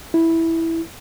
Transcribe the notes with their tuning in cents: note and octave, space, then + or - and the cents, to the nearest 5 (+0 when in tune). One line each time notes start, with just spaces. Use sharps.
E4 -5